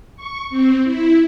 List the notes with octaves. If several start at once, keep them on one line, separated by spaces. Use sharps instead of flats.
C#6
C4
E4